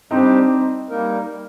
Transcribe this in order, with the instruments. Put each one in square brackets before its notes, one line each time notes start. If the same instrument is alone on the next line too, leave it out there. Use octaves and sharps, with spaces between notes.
[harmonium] G3 D4 G4 C5 [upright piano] C4 D#4
[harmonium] G3 A#3 D#4 A#4